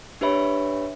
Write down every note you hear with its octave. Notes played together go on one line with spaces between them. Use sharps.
D4 G4 B4 C#5 E5 B5